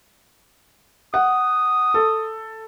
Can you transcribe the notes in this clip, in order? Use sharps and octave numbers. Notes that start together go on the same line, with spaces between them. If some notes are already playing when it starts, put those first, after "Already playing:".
F#5 D#6
A4